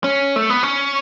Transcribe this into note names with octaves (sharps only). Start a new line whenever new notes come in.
C#4
A3
B3
C#4